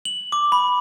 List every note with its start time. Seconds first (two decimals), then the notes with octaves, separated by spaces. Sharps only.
0.05 F#7
0.32 D6
0.52 B5